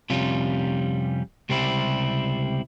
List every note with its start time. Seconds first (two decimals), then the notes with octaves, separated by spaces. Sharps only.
0.10 F2 C3 G3 C#4 F4
1.49 C#2 C3 G3 C4 E4